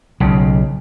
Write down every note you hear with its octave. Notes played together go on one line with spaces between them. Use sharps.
B1 C#3